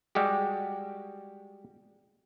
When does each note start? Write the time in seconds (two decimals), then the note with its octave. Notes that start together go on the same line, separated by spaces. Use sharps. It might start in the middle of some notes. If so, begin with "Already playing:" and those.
0.15 G3 G#3 F#4 G4